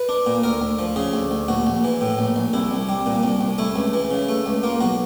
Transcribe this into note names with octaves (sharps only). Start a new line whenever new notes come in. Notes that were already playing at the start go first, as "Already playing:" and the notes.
Already playing: B4
D4
A#2
D2 A#4
D2
F3
C#3 G#4
D2
D2
A#1 F#4
A#1
E3
A2
A#1
A#1
C2 E4
C2
G3
A#2
C2
C2
A3 E4
C#2
E3
C#3
A3
C#2
A#3 F4
B1 F#4